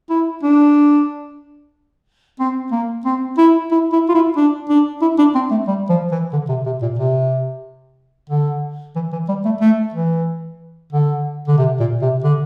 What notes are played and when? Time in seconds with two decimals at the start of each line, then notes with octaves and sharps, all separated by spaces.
0.10 E4
0.43 D4
2.39 C4
2.72 A#3
3.05 C4
3.38 E4
3.71 E4
3.93 E4
4.09 F4
4.14 E4
4.37 D4
4.69 D4
5.02 E4
5.19 D4
5.35 C4
5.51 A3
5.68 G3
5.90 F3
6.12 E3
6.33 D3
6.49 C3
6.66 C3
6.82 A#2
6.99 C3
8.30 D3
8.96 E3
9.12 E3
9.29 G3
9.45 A3
9.61 A3
9.94 E3
10.93 D3
11.48 D3
11.58 C3
11.80 A#2
12.02 C3
12.24 D3